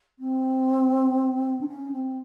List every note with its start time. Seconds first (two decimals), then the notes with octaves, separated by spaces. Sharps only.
0.19 C4
1.61 D4
1.67 C#4
1.92 C4